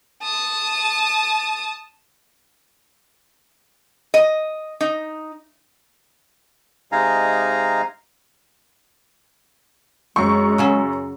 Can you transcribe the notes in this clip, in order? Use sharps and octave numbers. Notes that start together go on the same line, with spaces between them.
A5 D#6
D#5
D#4
C3 G#3 D#4 F5 G#5 A#5
F#2 G#3 C4 C#6
C#3 F#3 C#4